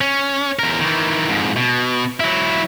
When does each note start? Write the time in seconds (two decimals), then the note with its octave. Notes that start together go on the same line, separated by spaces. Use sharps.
0.01 C#4
0.59 E2 A#4
0.81 D#3 E3
1.29 F2 G#2
1.57 B2
2.20 F#3 E4